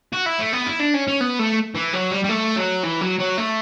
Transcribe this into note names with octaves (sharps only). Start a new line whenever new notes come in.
F#4
E4
A3
B3
E4
D4
C#4
C#4
B3
A3
E3
F#3
G3
G3
A3
F#3
E3
F#3
F#3
A3